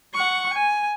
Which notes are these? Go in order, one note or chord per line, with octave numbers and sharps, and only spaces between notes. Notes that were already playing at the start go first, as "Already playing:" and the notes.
F#5 C#6
G#5